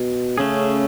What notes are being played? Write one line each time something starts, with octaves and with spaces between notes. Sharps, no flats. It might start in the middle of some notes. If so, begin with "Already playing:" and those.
Already playing: B2
C#3 A3 C#4 G#4